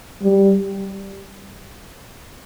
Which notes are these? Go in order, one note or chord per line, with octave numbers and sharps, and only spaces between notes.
G3